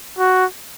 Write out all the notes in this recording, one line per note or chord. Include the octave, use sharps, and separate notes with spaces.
F#4